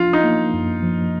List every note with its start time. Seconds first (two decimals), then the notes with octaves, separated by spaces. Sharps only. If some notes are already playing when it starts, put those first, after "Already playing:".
Already playing: F3 D4 F4
0.13 D#4
0.24 A#3
0.54 F#2
0.83 F3